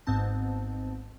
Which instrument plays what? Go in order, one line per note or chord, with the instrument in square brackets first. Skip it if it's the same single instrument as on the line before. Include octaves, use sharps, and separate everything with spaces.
[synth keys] G#1 G#2 B3 C4 A5